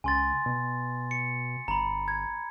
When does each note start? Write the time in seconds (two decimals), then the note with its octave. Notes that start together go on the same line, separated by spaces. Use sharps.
0.04 C#2 G#5 C6 A6
0.46 B2
1.11 C#7
1.68 G1 A#5 B5
2.08 G#6